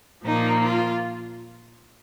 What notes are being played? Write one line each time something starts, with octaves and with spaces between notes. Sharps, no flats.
A#2 F3 A#3 D#4
F4